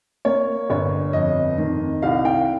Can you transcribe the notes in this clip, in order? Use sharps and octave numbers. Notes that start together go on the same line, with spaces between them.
A#3 C#5
G1 C#5
F2 D#5
D#3
C2 F5
G5